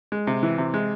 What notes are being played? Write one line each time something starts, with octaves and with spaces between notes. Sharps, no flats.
G#3
C3
E3
C3
G#3